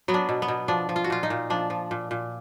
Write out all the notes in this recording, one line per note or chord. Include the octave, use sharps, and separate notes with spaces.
F#3 B3
D4
B2
B3
B2
F3 D4
F3
F4
F#4
A#2 F4
D#4
A#2
F3 D4
F3
A#2
A#2